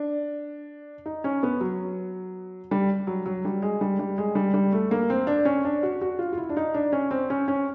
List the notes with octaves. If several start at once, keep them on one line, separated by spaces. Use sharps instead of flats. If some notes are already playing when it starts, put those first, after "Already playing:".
Already playing: D4
D#4
C#4
B3
F#3
G3
F#3
F#3
G3
G#3
G3
G3
G#3
G3
G3
A3
A#3
C4
D4
C#4
D4
F#4
F#4
F4
F4
E4
D4
D#4
D4
C#4
C4
C#4
C#4